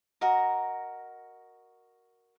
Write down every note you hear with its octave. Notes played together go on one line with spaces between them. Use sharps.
F#4 A#4 D#5 A#5